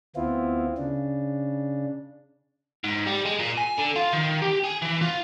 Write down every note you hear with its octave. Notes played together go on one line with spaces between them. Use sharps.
D2 B3 C4 E4 F4
C#3 D4
G#2
G3
G#3
A#2
G#5
D3
F4
D#3
G4
G#4
E3
F4